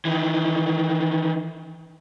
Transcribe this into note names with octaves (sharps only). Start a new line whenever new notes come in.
D#3 E3